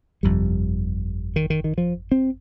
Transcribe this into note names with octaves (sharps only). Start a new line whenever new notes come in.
G1 F2 C3 G3
D#3
D#3
D#3
F3
C4